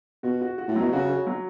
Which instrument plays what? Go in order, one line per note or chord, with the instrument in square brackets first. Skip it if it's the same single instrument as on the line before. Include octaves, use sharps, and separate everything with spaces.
[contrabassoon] B2 [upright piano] F#4
[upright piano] F#4
F#4
[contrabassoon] A2
[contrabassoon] B2 [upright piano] F#3
[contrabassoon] C#3 [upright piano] F#4
[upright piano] C#4
F#3